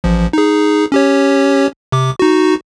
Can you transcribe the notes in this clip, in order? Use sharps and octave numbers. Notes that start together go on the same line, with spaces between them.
A1 F3
D#4 G#4
C#4 G4 C#5
C3 D6
D#4 F#4